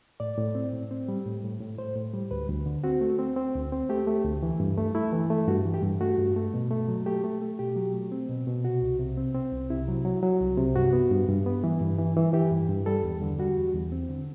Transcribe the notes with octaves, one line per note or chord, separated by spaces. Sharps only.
A2 D5
A2
C4
A2
C4
G3
A2
A2
A2
A2 C5
A2
G3
D2 B4
D2
D3
C4 F#4
A3
C4
C4
D2
C4
A3 G4
A3
D2
E3
G2
A3
A3 E4
E3
A3
G2 F#4
E3
G4
G2
A3 F#4
G2
A3
B2
A3
F#3
A3 G4
A3
A3
B2 G4
F#3
A3
C4
B2
B2
C3 F#4
C2
C3
C4
C4
C2
C3 E4
F#3
F#3
F#3
C2
C3
G2 F#4
B3
G2
G2
B3
E3
G2
E3
E3
E3 G4
G2
G2
G3 A4
E2
D3
G3 F#4
E2
E2
C4
D3